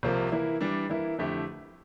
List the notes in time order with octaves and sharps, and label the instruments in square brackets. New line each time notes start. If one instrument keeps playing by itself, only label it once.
[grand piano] C2 C3 F3 A#3
E3 A#3 E4
E3 G3 D4
E3 A#3 E4
F2 D3 A3 E4 G4